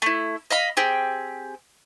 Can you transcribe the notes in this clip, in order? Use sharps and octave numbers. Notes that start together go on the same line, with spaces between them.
A3 E4
D#5 F5 B5
C4 G4 G#4 G5